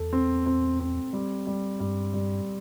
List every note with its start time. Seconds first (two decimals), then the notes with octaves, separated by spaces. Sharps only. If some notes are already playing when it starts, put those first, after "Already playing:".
Already playing: E2 A4
0.13 C4
0.46 C4
0.80 C4
1.13 G3
1.47 G3
1.80 G2 G3
2.14 G3